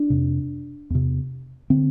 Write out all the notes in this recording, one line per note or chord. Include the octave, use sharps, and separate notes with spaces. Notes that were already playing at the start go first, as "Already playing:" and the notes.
Already playing: D4
F2 C3
E2 C3
D3 C4